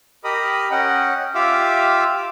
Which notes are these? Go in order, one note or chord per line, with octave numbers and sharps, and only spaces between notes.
G4 A#4 D#5 B5 D#6
C#4 D#5 F#5 G5
F4 G4 E5 F5 D6 E6